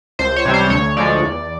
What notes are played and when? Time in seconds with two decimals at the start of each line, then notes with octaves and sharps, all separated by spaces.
0.19 C#2 C5
0.36 C#5
0.45 C3 E3 G3
0.54 C5
0.70 D2 C#5
0.97 D3 F3 G#3 D5
1.22 E2